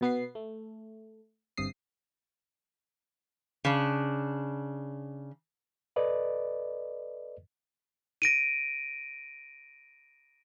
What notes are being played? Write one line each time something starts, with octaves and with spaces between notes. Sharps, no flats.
B2 B3 B4 C7
A3
G1 G2 C3 D#6 C7
C#3 D4
A4 B4 D5 D#5
A#6 D7 D#7